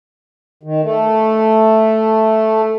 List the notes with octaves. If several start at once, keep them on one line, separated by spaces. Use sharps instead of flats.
D#3
A3